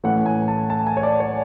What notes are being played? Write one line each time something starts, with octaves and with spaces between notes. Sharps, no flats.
A2 E3 A3 C#4 F#5
G#5
A5
A5
G#5
C#5
D5
C#5